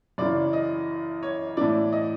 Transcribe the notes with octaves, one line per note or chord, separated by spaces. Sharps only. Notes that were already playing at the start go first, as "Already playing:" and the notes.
F#2 C#3 E3 D5
D#5
C#5
A2 E3 D5
D#5